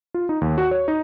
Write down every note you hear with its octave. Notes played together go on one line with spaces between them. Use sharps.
F4
D#4
D#2
F#4
C#5
D#4